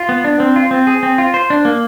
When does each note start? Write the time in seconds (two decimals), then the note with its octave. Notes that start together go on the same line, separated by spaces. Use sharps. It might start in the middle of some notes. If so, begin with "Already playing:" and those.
Already playing: F4
0.09 B3
0.24 D4
0.40 C4
0.56 F4
0.71 C4
0.87 G#4
1.03 C4
1.18 F4
1.34 C5
1.50 D4
1.65 A#3